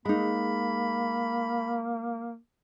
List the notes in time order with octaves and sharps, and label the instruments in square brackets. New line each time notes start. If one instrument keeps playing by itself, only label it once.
[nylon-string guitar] G#3 D#4 [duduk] A#3 [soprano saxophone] B5